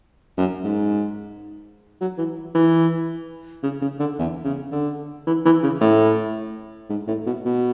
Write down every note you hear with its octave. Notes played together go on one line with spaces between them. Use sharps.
F#2
G#2
F#3
E3
E3
C#3
C#3
D3
E2
C#3
D3
E3
E3
C#3
A2
G#2
A2
B2
B2